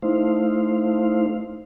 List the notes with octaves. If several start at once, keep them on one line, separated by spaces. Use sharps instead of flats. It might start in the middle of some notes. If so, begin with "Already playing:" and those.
A3 D#4 E4 C5 F5